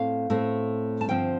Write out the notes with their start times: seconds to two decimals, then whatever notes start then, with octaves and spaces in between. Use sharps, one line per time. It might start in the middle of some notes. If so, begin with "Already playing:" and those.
Already playing: A2 A3 C4 F5
0.30 A2 A3 C4
1.01 A5
1.08 G2 D3 F3 C4 G5